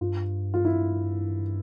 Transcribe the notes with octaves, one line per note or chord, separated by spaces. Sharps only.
G2 F4
F4
E4